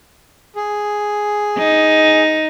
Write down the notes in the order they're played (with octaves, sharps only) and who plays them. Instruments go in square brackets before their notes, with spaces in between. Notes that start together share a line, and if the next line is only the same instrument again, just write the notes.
[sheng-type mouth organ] G#4
[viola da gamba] D#4